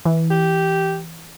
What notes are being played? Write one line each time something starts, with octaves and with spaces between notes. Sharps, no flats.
E3
G4